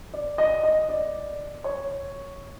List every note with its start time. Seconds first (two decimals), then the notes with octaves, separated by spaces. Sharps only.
0.14 D5
0.38 D#5
0.63 D#5
0.89 D5
1.64 C#5